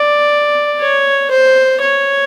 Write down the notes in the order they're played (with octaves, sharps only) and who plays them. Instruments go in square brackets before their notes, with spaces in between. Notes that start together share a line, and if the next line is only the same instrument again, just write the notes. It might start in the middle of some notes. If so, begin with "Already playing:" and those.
Already playing: [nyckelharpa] D5
C#5
C5
C#5